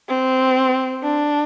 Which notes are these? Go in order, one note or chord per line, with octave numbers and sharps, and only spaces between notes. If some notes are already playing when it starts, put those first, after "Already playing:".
C4
D4